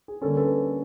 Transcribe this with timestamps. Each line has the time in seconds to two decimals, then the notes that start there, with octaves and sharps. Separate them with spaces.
0.08 G#4
0.22 D3 G3 A#3 C#4 A4
0.37 A4 B4